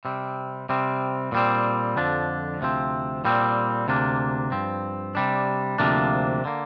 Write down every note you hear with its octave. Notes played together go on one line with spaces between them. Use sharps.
C3 G3 C4
C3 G3 C4
A#2 G3 C4
F2 D3 F3 D4
D2 C3 F3 C4
A#2 G3 C4
D2 C3 A#3 D4
G2 F3 C4
C3 G3 D4
D2 C3 F3 A#3 D4
D3 A#3